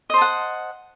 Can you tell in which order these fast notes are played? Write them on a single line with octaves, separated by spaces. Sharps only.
D#5 C5 A5 F#5